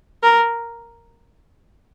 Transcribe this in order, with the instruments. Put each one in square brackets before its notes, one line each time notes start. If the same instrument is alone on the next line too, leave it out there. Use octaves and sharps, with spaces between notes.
[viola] A#4